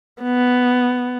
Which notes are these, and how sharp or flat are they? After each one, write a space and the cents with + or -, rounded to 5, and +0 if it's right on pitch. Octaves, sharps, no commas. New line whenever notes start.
B3 +5